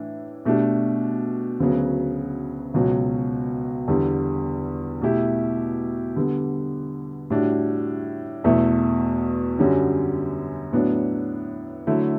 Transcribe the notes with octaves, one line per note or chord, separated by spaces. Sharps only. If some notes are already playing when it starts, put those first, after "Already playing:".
Already playing: A2 E3 D4
B2 A3 D4 G4
D2 C#3 F#3 B3
C#2 B2 F#3
E2 D3 G3
B2 A3 E4 G4
D3 G3 B3
A2 G3 D4 F#4
E2 B2 A3 E4
F#2 D3 G3 C#4 F#4
A2 F#3 B3 D4
D3 F#3 A3 E4